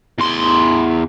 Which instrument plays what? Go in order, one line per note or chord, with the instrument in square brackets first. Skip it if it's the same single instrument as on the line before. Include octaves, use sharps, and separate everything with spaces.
[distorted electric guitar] E2 C6